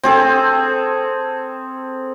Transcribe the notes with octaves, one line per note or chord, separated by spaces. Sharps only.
C4 G#4 A4